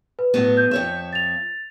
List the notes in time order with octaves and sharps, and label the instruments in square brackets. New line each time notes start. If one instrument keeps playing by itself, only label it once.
[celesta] B4
[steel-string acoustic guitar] A2 F#3 B3
[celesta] G6
[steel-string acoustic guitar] F2 C#5 E5
[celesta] A6 F7